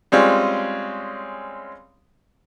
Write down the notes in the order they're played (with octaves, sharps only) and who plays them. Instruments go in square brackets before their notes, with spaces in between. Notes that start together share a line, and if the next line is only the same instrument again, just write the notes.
[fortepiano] G3 G#3 C4 C#4 F4